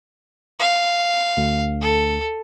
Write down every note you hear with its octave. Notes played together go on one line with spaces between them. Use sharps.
F5
D2
A4